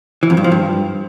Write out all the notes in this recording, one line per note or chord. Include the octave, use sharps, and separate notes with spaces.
E3
F2
G2
F3
G2